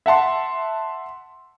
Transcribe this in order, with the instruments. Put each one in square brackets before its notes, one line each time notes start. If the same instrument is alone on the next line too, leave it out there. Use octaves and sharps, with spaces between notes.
[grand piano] E5 F#5 A5 C6